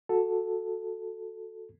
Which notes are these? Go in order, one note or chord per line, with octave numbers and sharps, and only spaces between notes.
F#4 A4